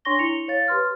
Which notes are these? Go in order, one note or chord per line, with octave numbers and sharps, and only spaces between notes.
D4 C#5 C6 C#6 A#6 G7
E4 C#7 F7 G7
C#5 F5 A6
G4 B4 C6 F6